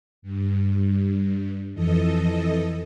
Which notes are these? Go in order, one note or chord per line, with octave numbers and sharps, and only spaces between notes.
G2
F2 E3 A4 D#5